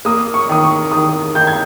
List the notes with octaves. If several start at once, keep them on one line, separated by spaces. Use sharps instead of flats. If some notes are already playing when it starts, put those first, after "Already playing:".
A#3 D#6
C#6
D#3 D#6
C#6
D#3 D#6
D#3 G6
G#6